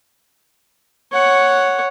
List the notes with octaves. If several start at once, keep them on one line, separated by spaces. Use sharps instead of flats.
C#5 F#5